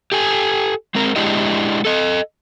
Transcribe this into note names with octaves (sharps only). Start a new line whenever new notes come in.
G4 A4 G#5
G#3 C4 A#4
G#3 D4 E4 G4 D#5
A4 D#5